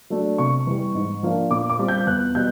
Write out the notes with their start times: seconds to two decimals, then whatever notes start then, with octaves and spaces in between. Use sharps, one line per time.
0.10 F#3 A3 D4
0.38 C3 C#6
0.67 E3 G3
0.95 G#2
1.23 F3 A#3 D4
1.51 A#2 D6
1.70 D6
1.79 G3 C4 F4
1.88 G6
2.07 E2 F#6
2.35 B2 G3 G6